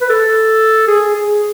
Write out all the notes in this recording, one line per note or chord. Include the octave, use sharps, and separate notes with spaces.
B4
A4
G#4
G#4